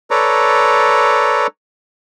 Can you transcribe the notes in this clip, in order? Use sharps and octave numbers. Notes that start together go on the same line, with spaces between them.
A4 B4 C#5 D5 A#5